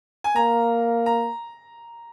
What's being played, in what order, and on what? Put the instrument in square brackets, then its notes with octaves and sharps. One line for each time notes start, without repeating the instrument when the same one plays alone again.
[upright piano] G#5
[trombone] A#3 [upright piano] A#5
[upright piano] A#5